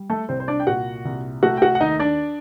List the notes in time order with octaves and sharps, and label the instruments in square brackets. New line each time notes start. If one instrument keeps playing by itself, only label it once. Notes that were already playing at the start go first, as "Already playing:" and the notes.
Already playing: [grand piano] G3
A3 A4
C2 C4 C5
C5
D4 D5
G5
A#2 F#4 F#5
C2
A3 F#4 F#5
G5
F#4 F#5
F#5
D#2 D#4 D#5
D4 D5